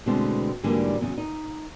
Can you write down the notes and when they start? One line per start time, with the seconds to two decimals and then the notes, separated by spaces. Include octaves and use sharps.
0.06 B2 D3 E3 G#3 A3 C4
0.63 G#2 D3 E3 F#3 G3 A#3
1.01 E2 C#3 F#3
1.18 D#4